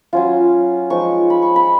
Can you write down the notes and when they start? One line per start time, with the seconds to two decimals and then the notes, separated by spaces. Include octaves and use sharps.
0.13 F#3 C#4 F4
0.90 F3 G#3 D#4 C#6
1.30 B5
1.42 C#6
1.56 B5